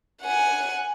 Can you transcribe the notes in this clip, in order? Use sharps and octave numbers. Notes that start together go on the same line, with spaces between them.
F#5 G#5